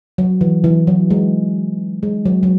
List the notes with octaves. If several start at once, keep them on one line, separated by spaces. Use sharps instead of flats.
F#3
E3
E3
F#3
G#3
G#3
F#3
F#3